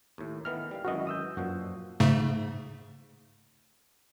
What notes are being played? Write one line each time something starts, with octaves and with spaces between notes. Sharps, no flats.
D#2 A2
D#3 E3 B3 F6
G3 F5
G#1 F#2 E3 F#4 D#5
D#6 E6 G6
F#2 A#2 F3 F#4
G#2 C#3 A3